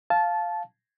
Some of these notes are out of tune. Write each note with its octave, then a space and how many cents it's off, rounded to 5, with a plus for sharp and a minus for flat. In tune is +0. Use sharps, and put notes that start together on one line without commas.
F5 +0 A5 -15